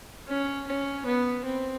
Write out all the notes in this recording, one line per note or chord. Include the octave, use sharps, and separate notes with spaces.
C#4
C#4
B3
C4